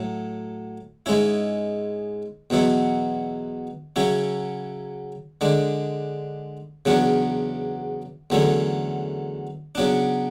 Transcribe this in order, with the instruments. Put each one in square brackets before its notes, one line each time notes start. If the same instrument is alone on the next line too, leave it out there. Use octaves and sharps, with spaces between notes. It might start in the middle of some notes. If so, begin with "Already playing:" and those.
Already playing: [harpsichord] A2 F#3 A3
G#2 G#3 C#4 E4
E2 B2 F#3 B3 E4
C#3 F#3 C#4 E4
D3 G#3 D4
E2 C#3 F#3 B3 D4
E2 D3 F#3 A3 C#4
C#3 F#3 B3 D4